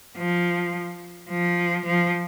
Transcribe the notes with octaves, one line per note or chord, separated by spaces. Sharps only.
F3
F3
F3